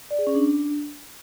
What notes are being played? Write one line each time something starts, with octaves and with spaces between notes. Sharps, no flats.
D5
G#4
C#4
D4